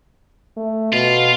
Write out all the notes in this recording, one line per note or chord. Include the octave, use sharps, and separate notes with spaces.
A3
B2 F4